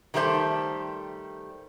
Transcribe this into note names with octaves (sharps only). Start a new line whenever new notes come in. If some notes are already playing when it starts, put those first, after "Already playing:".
D#3 G3 A3 B3 C5 A5